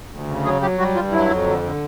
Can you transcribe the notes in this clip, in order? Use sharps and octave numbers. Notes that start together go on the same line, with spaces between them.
D2
C#3
F#3 G#4
F#3 G4
G3 F#4
G2 F4
F#3 E4
F2
D3
D3